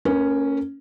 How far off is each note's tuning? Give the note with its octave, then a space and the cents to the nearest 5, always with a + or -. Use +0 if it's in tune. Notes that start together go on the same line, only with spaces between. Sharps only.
A#3 -35 C#4 +0 A#4 +35